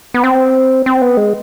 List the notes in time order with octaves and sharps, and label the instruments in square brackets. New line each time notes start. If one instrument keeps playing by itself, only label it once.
[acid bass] B3
C4
C4
B3
G#3